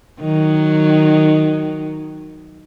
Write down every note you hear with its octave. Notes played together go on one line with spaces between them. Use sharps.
D#3 F#3